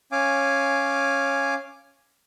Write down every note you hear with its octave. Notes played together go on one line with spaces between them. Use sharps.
C#4 F5 G#5 D6